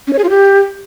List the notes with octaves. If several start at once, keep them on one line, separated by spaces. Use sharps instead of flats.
C#4
C#5
G#4
F4
G4